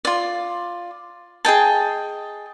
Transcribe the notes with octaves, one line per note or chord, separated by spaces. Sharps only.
F4 D5
G#4 D#5 G5 A5